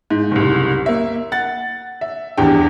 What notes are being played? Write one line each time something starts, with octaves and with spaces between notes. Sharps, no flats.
G#2
F#1 C2
A#3 E5
F#5 A6
E5
D#1 E2 G2 G5